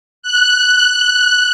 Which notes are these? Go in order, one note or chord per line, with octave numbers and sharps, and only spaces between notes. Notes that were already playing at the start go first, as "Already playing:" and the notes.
F#6